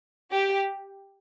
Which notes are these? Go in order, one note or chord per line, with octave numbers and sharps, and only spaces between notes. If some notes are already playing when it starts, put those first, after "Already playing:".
G4